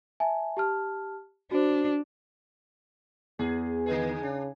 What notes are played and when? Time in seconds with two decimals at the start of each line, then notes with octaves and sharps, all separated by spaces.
0.20 E5 G#5 A5
0.57 G4 A5 F6
1.51 D4 F#4 C5
3.39 E2 G#4
3.86 D3 G#3 G#4 B4
4.23 C#3 D4